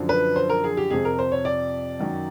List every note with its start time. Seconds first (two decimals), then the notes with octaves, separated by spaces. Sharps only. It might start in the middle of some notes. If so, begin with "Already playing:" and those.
Already playing: F#2 D3 F3
0.09 B4
0.36 C5
0.49 A#4
0.64 G#4
0.77 G4
0.90 F2 C3 F3 G#4
1.05 A#4
1.19 C5
1.32 C#5
1.45 D5
1.99 F#2 D#3 F#3